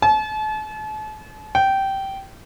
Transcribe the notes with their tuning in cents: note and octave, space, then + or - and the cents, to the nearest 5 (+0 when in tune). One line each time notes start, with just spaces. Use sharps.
A5 -40
G5 -15